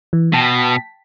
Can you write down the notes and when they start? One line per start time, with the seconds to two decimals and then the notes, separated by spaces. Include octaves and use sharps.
0.13 E3
0.33 B2 G5 A5 B6